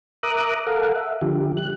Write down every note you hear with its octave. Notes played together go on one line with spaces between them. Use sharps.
A#4 E5 A#5 D6 D#6 F#6
A4 A#4 F5 F#5
E5
D3 F3 G4
G3 F#6